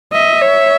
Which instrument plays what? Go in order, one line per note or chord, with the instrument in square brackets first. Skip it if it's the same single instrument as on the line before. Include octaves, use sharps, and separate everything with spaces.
[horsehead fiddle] D#5 [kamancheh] E5
[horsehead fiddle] C#5